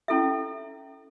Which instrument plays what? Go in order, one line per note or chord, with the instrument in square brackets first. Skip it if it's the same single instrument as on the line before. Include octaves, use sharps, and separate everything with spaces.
[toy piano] C#4 E4 A4 E5